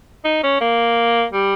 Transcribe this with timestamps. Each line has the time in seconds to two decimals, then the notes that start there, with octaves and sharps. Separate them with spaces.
0.25 D#4
0.44 C#4
0.61 A#3
1.32 G3